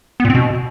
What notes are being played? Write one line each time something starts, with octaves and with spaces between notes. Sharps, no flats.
B3
A#2
C4
B2